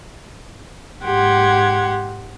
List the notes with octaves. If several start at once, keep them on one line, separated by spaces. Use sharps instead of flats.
G#2 G4 F#5 C6 G#6